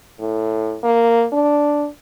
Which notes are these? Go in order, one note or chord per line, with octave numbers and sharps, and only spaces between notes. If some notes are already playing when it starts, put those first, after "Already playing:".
A2
A#3
D4